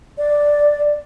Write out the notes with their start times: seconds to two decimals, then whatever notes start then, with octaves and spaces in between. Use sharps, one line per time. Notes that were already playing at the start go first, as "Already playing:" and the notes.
0.18 D5